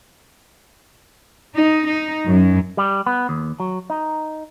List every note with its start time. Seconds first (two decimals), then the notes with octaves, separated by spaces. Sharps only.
1.54 D#4
1.87 D#4
2.25 F#2
2.77 G3
3.06 B3
3.29 D#2
3.60 F#3
3.90 D#4